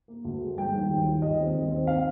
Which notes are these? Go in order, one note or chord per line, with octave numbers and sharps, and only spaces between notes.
A#3
D2
G#3
G1 G5
D#3
D#2
F4
D#2 D#5
C4
D#2
C4
F5